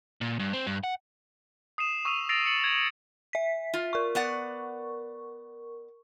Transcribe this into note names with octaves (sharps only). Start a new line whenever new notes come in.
A#2
G2
C4
G2
F#5
D#6 C7 D#7 E7
C#6 D#6 E6 D#7 F7
E6 A6 A#6 C7 D7 F7
C#7 F#7
G#6
E5 B6
F4
A#4 C#6
B3 D5 F#5